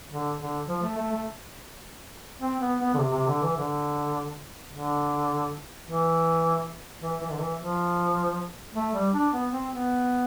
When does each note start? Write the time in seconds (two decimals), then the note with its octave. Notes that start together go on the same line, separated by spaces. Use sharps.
0.11 D3
0.39 D3
0.68 F3
0.83 A3
0.97 A3
1.12 A3
2.41 C4
2.61 B3
2.80 B3
2.94 D3
2.99 C3
3.13 C3
3.28 D3
3.42 E3
3.57 D3
4.72 D3
5.86 E3
7.02 E3
7.21 E3
7.31 D3
7.40 E3
7.60 F3
8.75 A3
8.94 G3
9.13 D4
9.33 B3
9.52 C4
9.71 B3